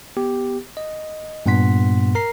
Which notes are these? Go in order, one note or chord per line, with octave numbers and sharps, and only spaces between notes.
B3 G4
D#5
G2 A#2 B3 F#5 C6 B6
A#4 A#5 C7